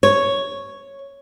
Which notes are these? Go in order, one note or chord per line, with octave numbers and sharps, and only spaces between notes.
C#5